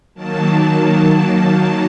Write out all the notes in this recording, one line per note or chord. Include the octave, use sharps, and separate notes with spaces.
D#3 F#3 A#3 A5